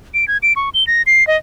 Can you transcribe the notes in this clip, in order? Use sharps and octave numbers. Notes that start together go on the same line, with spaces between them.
D7
G#6
D7
C#6
G7
A#6
C7
D#5